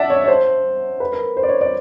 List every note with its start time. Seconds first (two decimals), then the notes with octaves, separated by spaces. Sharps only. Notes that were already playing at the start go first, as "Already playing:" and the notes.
Already playing: D5 E5 F#5 A5
0.10 C#5
0.24 C#5
0.28 C5
1.00 B4
1.13 A#4
1.37 C5
1.43 D5
1.49 C#5
1.61 D5